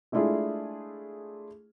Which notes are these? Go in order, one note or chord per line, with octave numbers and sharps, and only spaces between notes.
G#3 A3 D4 E4 F4 G#4